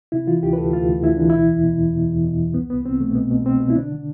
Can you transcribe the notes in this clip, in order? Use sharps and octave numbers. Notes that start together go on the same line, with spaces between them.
C3 E4
E3 F4
D2 G4
B4
D2 A4
D2 F4
D2
D2 E4
E3 D4
B2 E4
E2
B2
E2
B2
E2
B2
E2
C2 B3
C2 B3
C2 C4
B2 A3
B2 B3
B2
B2 C4
B2
E4
D3 D4
D3